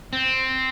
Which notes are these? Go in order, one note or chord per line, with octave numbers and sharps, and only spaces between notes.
C4